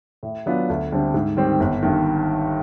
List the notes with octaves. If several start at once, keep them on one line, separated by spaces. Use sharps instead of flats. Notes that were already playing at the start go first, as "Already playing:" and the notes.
A2
F#3 B3 D4 F4
D2
D3 G3 C4
G#2
D#3 G3 C4
G1
G2 D#3